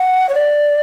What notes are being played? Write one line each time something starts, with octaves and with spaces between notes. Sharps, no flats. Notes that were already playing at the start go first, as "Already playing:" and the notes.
Already playing: F#5
C#5
D5